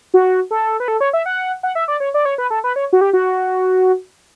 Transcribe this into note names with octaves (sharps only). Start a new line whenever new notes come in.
F#4
A4
B4
A4
C#5
E5
F#5
F#5
E5
D5
C#5
D5
C#5
B4
A4
B4
C#5
F#4
G4
F#4